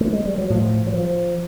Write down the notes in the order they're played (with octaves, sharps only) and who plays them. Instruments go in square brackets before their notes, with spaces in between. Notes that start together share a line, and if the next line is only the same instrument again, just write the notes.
[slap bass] A3
G#3
G3
F#3
A2 F3
F#3
F3